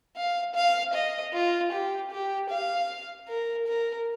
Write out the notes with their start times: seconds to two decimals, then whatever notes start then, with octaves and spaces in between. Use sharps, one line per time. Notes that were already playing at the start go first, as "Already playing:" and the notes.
0.16 F5
0.55 F5
0.94 D#5
1.34 F4
1.72 G4
2.11 G4
2.50 F5
3.28 A#4
3.68 A#4